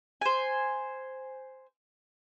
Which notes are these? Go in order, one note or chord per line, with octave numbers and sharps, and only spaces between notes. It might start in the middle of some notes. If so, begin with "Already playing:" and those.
C5 G#5